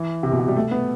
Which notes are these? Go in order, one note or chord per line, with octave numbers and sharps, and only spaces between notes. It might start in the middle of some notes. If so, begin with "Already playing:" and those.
Already playing: E3
C3
B2
C3
G3
A3
B3